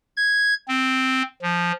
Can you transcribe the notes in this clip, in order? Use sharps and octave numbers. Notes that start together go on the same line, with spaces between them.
G#6
C4
F3